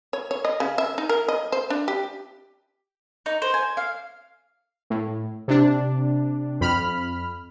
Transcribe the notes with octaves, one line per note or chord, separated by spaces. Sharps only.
C#5
C#5
D#5
C#3
E5
D#4
A#4
D#5
C5
D4
G4
D#4
C5
G#5
F5
A2
C3 D4
F2 B5 F6